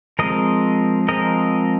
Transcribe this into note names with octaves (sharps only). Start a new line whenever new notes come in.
F3 G#3 C4 A#4 D#5
F3 G#3 C4 A#4 D#5